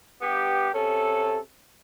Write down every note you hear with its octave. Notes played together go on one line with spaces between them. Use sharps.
G2 B3 G4
C3 C#4 A4